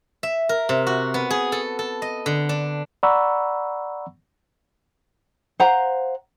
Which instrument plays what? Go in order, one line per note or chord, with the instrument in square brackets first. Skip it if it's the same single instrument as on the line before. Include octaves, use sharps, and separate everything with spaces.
[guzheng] E5
A#4
C3
F#4
B3
G#4
A4
A4
D#5
D3
D4
[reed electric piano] D5 F#5 A#5 B5 C#6 E6
[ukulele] C5 F5 F#5 A#5